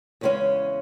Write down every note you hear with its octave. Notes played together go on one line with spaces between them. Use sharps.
E2 C#3 G#3 C#4